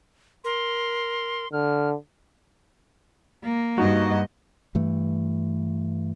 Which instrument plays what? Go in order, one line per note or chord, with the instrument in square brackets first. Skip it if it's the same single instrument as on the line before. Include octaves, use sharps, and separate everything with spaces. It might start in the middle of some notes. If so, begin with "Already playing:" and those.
[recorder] A#4 [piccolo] C6
[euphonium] D3 [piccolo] F6
[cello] A#3
[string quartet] G2 D#5 [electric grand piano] D#4 F#4
[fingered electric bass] G2 E3 A3